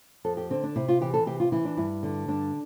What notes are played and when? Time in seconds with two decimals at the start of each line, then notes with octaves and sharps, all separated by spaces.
0.25 F2 A4
0.37 G4
0.50 D3 C4
0.63 D4
0.76 C3 E4
0.88 F4
1.01 E3 G4
1.14 A4
1.26 C3 G4
1.40 F4
1.52 E3 E4
1.65 D4
1.77 G2 E4
2.03 D3
2.28 G2 D4